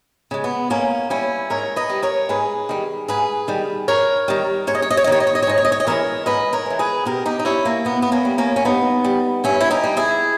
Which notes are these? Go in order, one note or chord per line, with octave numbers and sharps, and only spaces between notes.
C#3 G#3
B3
G#2 A#3 C#4
G3 C#4 E4
G#2 A#4 C#5
B4 D#5
G3
A#4 C#5
G#2 G#4 B4
D#3 G3
G#2 G#4 B4
D#3 G3
G#2 A#4 C#5
D#3 G3
G#2 C#5
D#5
C#5
D#5
C#5
D#5
D#3 G3 C#5
D#5
C#5
D#5
C#5
G#2 D#5
C#5
D#5
C#5
D#5
E3 G#3 A#4 C#5
G#2 B4 D#5
A#4 C#5
E3 G#3
G#4 B4
B2 G4 A#4
D#4 G4
D#4
G3 C#4 E4
A#3
B2 B3
B3
A#3 C#4
G3
A#3 C#4
C#4
G2 B3 D#4
G3
G2 C#4 E4
E4
D#4 G4
G3
E4 G#4